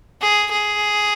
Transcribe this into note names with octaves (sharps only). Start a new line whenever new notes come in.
G#4
G#4